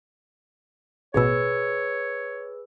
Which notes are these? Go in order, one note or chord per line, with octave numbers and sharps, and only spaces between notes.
A1 B2 G#4 B4 C#5 E6